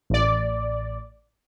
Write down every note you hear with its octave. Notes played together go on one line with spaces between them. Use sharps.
A1 D5